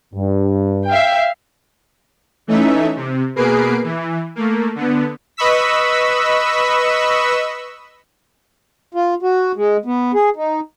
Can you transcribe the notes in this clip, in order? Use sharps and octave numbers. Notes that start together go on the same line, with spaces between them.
G2
E5 F5 G5
E3 A3 C#4 D#4 E5
C3
B2 A#3 G#4 B4 C7 D7
E3
A3 A#3
D3 B3
B4 D#5 B5 C#6 E6 B6
F4
F#4
G#3
B3
G#4
D#4